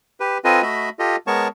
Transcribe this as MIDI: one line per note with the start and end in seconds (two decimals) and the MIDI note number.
0.20 0.38 67
0.20 0.38 71
0.44 0.62 60
0.44 0.62 65
0.44 0.62 69
0.44 0.62 71
0.44 0.62 75
0.44 0.62 80
0.62 0.89 57
0.62 0.89 66
0.62 0.89 75
0.62 0.89 76
0.62 0.89 83
0.99 1.16 65
0.99 1.16 67
0.99 1.16 69
0.99 1.16 75
1.27 1.48 56
1.27 1.48 59
1.27 1.48 70
1.27 1.48 73
1.27 1.48 81
1.27 1.48 85